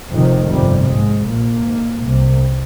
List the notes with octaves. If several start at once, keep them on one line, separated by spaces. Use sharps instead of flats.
F1 F2 C3 D#3
G1 F2 C3 G3
A#1 G#2 G#3
A#1 A#2 A#3
G#1 G#2
C2 C3